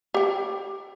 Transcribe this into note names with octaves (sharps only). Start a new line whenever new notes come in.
G4 G5